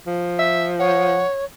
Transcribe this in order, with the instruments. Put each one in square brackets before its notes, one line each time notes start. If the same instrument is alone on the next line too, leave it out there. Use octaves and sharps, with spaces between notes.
[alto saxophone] F3
[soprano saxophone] E5
[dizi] C#5 [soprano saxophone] F#5